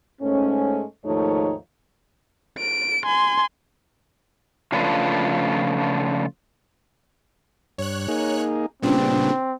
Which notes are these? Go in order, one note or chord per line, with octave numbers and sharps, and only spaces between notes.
G#2 G#3 A3 C#4
D#2 G#2 F3 A3 D#4 C#5
D7
G#5 C6
C#3 F3 A3 D4 F4 B4
G2 C#5 F#6
A#3 D#4 G#4
A#2 C#3 G3 B3 C4 D4